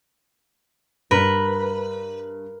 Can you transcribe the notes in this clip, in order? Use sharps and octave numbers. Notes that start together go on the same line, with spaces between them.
G2 A#4 B4